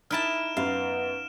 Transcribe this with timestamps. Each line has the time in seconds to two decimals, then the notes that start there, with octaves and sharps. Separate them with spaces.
0.11 D#4 E4 A5 F6 D7 E7
0.57 F#2 B3 F5